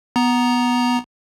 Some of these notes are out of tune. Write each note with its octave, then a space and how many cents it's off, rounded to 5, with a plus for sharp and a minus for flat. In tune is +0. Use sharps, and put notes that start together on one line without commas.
B3 +0 A#5 +10